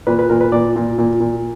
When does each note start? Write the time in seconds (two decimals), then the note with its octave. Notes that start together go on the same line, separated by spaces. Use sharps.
0.07 A#2 B4
0.19 B4
0.29 A#2 A#4
0.41 B4
0.52 A#2 D5
0.76 A#2
0.98 A#2
1.20 A#2